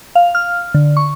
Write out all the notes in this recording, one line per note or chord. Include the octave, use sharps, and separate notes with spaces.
F5
F6
D3
C#6